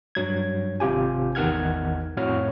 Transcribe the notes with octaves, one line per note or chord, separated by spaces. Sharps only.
G2 F#3 G#6
G#1 C3 F4 G4 G#5
A1 E2 D#3 F#5 F6 G#6
F2 A2 F#4 C#5 F6